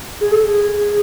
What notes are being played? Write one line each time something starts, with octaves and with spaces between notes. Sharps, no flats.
G#4
A4
G#4